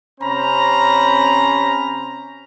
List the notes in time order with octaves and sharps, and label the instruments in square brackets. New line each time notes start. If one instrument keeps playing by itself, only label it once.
[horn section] C3 C4 C#4 C5 A#5 B5